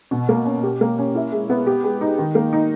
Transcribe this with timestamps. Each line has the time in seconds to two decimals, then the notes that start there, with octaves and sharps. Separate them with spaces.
0.11 B2
0.29 A#3
0.45 C#4
0.63 G4
0.81 A#3
0.98 C#4
1.15 E4
1.32 G#3
1.50 B3
1.67 G4
1.83 G#3
2.01 D#4
2.18 D#3
2.35 A#3
2.53 D#4